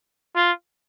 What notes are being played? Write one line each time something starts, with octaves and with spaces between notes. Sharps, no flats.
F4